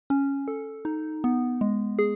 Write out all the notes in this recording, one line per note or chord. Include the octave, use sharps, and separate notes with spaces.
C#4
A4
D#4
B3
G#3
G#4